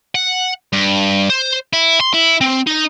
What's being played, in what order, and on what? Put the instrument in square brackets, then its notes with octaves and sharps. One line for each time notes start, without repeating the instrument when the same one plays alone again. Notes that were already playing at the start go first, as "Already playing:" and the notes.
[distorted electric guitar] F#5
G2
C5
E4
C6
E4
C4
D#4